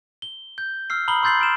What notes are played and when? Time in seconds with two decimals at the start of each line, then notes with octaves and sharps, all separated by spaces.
0.22 G7
0.58 G6
0.90 E6 F6 C7
1.08 A#5 B5 D#6 F#7 G7
1.23 C6 E6 G6 A6 C7 F#7
1.39 F6 D7 E7